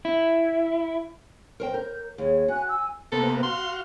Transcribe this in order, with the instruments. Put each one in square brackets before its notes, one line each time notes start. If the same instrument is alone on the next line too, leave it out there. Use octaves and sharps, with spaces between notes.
[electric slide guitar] E4
[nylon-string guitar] A#4 C5 G5
[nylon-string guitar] A#4 [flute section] G6
[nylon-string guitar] D#2 [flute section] G#4 C#5
[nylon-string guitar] F#4 [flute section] G#5 F#6
[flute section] G#5 E6
[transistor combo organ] C3 A#3 B3 [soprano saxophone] A4
[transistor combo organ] F#4 F5 [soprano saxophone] C6